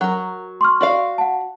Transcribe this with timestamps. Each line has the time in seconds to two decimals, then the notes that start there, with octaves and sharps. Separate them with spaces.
0.01 F#3 A#4
0.61 C6 C#6 F6
0.81 F#4 D5 F5
1.18 F#5 A5